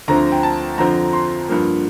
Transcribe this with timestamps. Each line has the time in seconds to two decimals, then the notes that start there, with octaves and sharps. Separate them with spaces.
0.08 D2 D3 F3 C4 A#5
0.32 G5
0.43 A5
0.78 F2 D3 F3 C4 A#5
1.13 C6
1.48 G2 F3 A#3